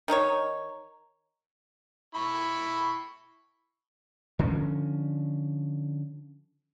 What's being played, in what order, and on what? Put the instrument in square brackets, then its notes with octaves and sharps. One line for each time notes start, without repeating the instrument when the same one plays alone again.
[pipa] D#3 D#4 F4 C#5
[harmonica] E4 B5 C#6
[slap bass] D3 F3 B3 C#4